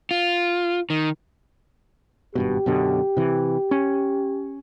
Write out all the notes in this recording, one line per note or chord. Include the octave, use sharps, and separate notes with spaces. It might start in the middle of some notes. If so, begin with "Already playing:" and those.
F4
D#3
G#1 G2 B2 G4
F#2 B2 D3
C3 E3
C#4